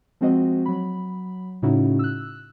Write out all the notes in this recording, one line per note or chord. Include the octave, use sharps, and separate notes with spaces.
F3 G#3 C4 F#4 C5 D#5
F#3 B5
A2 C#3 C#4 D#4 E4 F#4
E6 F#6